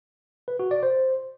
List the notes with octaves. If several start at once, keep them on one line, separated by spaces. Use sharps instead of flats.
B4
F#4
D5
C5